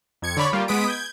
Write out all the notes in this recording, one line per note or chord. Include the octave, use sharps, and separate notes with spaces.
F2 G#6 C#7
D3 C#5 D5 B5 C#6
G3 A#3 F4 G4
G#3 B3 D#6 B6 D7
G6 G#6